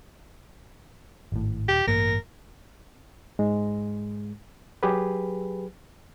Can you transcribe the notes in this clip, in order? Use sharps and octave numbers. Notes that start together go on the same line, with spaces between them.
G#1 A2
D#1 G4
A1 G2 A#3 A#4
G#2 G#3
F#3 G4 G#4 B4